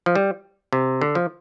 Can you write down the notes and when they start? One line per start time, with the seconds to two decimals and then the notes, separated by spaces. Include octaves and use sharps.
0.06 F3
0.15 G3
0.73 C3
1.01 D3
1.15 F3